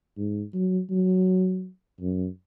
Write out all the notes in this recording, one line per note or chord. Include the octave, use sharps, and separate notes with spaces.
G#2
F#3
F#3
F#2